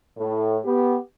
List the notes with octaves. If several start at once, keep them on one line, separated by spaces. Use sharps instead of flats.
A2
B3 G4